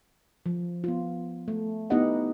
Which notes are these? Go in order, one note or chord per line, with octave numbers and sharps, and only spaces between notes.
F3
B3 F4
A3
B3 D#4 E4 G4 D#5 F#5